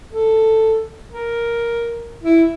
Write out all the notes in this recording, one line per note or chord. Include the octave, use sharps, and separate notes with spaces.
A4
A#4
E4